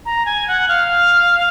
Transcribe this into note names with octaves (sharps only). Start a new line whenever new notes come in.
A#5
G#5
F#5
F5